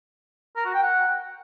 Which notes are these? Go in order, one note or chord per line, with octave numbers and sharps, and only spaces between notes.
A#4
F#4
G5
F#5